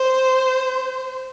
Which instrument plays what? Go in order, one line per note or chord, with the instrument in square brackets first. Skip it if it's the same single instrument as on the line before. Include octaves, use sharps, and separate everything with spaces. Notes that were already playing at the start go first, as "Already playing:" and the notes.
Already playing: [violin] C5